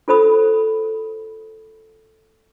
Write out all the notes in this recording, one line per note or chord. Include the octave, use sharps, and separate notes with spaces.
F4 A4 C5 B5 D#6